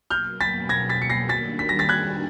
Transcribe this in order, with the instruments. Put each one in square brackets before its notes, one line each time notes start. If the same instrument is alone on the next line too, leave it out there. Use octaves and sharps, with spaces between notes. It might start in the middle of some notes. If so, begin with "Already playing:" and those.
[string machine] B2 F#3 A#3 [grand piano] F6 G6
[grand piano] A6 B6
G#6 A#6
A6 B6
C#7
A#6 C7
[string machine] D#3 G3 A#3 D4 F#4 [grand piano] A6 B6
[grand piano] B6
A#6
A6 B6
F#6 G#6